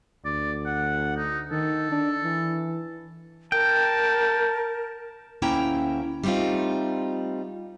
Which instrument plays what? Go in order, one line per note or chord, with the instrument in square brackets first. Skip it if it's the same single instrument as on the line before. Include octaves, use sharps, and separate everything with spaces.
[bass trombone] D2 [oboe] D5
[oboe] F#5
D#4
[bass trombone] D#3 [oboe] A4
[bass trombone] D4
E3
[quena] A#4 [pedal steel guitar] G5 [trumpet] A5
[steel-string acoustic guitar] D2 A#3 C#4 E4 G5 A#5
G3 A3 C4 D#4 F4